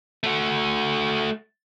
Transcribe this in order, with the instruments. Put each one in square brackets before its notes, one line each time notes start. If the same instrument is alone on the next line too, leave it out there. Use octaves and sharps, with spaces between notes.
[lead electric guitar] A3 F#4